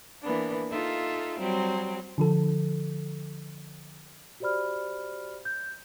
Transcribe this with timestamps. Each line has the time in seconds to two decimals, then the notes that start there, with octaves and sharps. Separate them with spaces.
0.22 E3 A#3 B3 D4
0.71 D#4 F4 A4 E5
1.38 F#3 G3 C4
2.18 D3 F3 A4
4.40 F#4 G4 C5 D5 B5 F6
5.45 G6